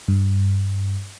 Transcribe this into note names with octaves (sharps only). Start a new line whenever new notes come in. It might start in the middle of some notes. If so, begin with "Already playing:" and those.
G2